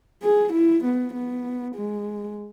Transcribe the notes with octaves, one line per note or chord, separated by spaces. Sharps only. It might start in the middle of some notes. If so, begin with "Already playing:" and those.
G#4
E4
B3
B3
G#3